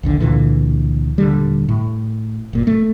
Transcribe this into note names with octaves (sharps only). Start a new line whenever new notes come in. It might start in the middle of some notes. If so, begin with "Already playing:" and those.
A#1 D#2 D3
C#2 A#2 D3 E3
D#1 D3 G3
A2
F#1 A#2
A3